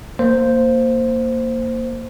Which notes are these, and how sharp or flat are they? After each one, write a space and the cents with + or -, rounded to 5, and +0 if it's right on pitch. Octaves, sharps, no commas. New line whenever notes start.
A#3 -10 C5 -5